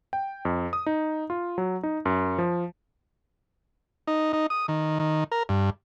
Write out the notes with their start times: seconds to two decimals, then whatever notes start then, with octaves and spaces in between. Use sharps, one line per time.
0.13 G5
0.45 F2
0.73 D#6
0.86 D#4
1.30 F4
1.58 F#3
1.83 D#4
2.05 F#2
2.38 F3
4.07 D#4
4.33 D#4
4.50 D#6
4.68 D#3
5.00 D#3
5.32 A#4
5.49 G2